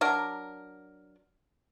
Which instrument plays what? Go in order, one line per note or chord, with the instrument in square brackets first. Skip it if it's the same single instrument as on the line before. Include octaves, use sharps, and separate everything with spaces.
[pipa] F#3 D4 A#4